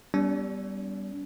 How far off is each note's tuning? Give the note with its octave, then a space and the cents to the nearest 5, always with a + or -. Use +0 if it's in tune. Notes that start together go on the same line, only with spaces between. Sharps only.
G3 +0 B3 +0 D4 -45